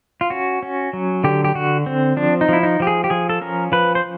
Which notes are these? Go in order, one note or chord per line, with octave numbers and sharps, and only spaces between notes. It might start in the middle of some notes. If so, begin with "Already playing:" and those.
F4
C#4 F#4
C#4
F#3
D3 G4
G4
D3 F#4
C4
F3 D4
D#4
F3 E4
D#4
F3 G4
G#4
G4
F3 G#4
A4
C#4 A#4
F3 B4
C5